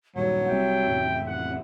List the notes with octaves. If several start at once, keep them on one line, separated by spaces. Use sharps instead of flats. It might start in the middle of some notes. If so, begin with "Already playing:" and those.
D#1 A#1 G2 F#3 F#5
C2 G3 C4 E5 G5
A1 F2 C3
F#5